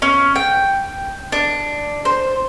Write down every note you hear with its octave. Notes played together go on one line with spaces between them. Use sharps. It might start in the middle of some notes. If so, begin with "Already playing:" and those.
C#4
G5
D4
C5